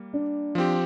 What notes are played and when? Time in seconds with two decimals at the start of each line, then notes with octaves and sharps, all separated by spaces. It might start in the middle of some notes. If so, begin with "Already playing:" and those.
Already playing: G3 A#3
0.13 D4
0.55 F3 C4 G4